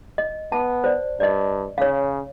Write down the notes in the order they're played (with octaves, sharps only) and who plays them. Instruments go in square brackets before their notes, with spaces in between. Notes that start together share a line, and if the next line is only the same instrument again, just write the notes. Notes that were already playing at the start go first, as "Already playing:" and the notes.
[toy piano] D#5
[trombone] B3 [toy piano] A5
[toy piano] C5 D5
[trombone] G2 [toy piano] D5 D#5
[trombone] C#3 [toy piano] C#5 F5